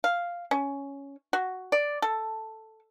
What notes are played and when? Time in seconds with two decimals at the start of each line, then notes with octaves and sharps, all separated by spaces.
0.04 F5
0.51 C#4
1.33 F#4
1.72 D5
2.02 A4